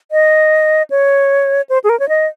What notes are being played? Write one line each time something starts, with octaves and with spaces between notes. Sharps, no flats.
D#5
C#5
C5
G#4
A#4
C#5
D#5